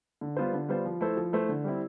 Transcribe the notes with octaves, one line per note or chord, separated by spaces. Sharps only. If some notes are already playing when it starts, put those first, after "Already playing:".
D3
G3 B3 F4 C5
D3
G3 B3 F4 C5
F3
A3 E4 A4 C5
F3
A3 E4 A4 C5
D3
G3 C4 E4